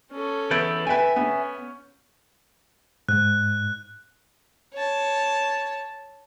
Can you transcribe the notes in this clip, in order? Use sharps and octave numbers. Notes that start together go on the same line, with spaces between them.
C#4 A4
E3 B3 E4 G6 A6 D7
B4 E5 G5 G#5
B3 C#4
G#2 F#6
C#5 A5